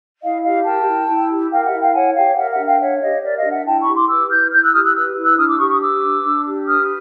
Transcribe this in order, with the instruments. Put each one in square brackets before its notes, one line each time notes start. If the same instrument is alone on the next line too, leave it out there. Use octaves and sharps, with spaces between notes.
[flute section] E4 D#5 F5
G4 D#5 F5
A#4 G5 A5
E4
E4
G4
A#4 F5 G5
E5 F#5
E4
F5 G5
C#5 F#5 G#5
G4 F5 G5
A#4 E5 F#5
E5 F#5
D4
F5 G5
C#5 E5 F#5
G4 D#5 F5
A#4 D5 E5
D#5 F5
D4
E5 F#5
E4 G5 A5
B5 C#6
G4
C6 D6
B4 D6 E6
E4 F6 G6
E4 F6 G6
E6 F#6
G4 D#6 F6
E6 F#6
B4 E6 F#6
E4
E6 F#6
D4 D#6 F6
D6 E6
G4 C#6 D#6
C#6 D#6
B4 D6 E6
D4
D4
G4
B4 D#6 F6